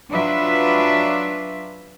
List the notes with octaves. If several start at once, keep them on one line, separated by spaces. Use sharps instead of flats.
F#3 D4 F4 B4 E5